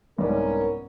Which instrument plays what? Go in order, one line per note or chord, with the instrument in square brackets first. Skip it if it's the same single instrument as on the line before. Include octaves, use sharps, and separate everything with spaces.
[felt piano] C2 G#2 D5 [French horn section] B3 C#4 A#4